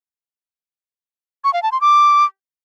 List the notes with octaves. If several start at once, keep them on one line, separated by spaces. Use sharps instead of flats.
C#6
F5
A5
C6
D6